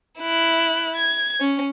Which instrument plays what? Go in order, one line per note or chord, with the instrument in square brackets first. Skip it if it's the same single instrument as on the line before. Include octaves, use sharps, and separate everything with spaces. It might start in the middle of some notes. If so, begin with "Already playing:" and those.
[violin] E4 F#6
G#6
C#4